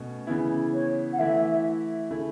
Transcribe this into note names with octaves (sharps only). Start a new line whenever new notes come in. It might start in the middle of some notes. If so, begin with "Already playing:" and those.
Already playing: B2 A3 C#4
C#3 E3 B3 E4
C#5
F#5
E3 A3 E4 E5
C#3 A3 E4